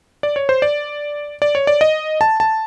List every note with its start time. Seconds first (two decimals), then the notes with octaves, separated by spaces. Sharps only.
0.23 D5
0.36 C#5
0.49 C5
0.62 D5
1.42 D5
1.55 C#5
1.67 D5
1.81 D#5
2.21 A5
2.40 A5